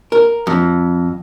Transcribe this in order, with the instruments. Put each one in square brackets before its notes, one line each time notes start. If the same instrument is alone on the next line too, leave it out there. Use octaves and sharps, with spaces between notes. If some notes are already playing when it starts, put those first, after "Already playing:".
[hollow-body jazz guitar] A#4
F2